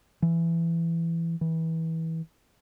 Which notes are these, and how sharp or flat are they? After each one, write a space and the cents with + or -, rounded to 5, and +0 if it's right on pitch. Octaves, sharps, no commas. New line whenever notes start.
E3 +15
E3 -25